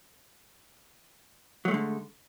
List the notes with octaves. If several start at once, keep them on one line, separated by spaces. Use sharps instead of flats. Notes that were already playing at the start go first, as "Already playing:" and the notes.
D3 F#3 G#3 A3